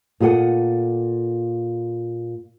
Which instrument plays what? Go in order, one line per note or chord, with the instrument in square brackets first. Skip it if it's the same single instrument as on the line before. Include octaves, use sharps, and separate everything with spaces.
[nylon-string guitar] A#2 F4 G#4 A4 F#5